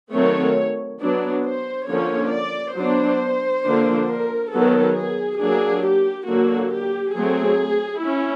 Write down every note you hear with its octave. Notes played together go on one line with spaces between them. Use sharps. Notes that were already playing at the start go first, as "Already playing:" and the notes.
D#3 F#3 A3 C4 C#5
F#3 B3 D4
C5
D3 F3 A#3 C#4 C#5
D5
F#3 B3 D4 C5
D3 F3 A#3 D4
A#4
D#3 F#3 B3 A4
G#4
F#3 A#3 D4 G#4
G4
D3 F#3 A#3 F#4
G4
F#3 A3 C4 G#4
C#4 E4